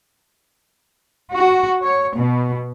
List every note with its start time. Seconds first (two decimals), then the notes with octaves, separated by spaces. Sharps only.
1.35 F#4
1.81 C#5
2.13 B2